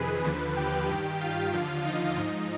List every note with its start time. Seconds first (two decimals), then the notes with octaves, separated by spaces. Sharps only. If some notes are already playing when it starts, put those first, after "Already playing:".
Already playing: F2 C3 D#3 G#4 B4
0.24 D#2 D3 F3
0.57 G4 G5
0.89 G2 D#3
1.21 F4 F5
1.54 D#2 D3 F3
1.85 D#4 D#5
2.17 G#2 F3